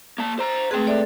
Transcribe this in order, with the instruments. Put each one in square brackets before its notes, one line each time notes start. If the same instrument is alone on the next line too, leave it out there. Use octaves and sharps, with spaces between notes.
[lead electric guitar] A#3 A5
C5 A#5
[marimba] A3 C4 G#4 [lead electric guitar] B4 G5
[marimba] A4 D5 E5